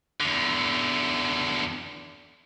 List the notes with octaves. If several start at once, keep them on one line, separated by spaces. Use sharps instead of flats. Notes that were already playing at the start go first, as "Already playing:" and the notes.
E2 D3